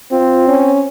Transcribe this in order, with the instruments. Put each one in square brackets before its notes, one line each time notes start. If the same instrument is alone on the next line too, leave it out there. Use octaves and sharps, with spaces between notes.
[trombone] C4 [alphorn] F4
[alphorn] C#4